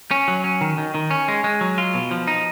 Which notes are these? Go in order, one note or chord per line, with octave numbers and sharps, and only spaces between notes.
C#4
F#3
C#4
D#3
D#3
D#3
C#4
G#3
G#3
F#3
F4
B2
F3
D#4